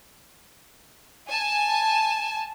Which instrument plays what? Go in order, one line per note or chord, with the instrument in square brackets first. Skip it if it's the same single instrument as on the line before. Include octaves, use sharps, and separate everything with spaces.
[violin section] G#5 A5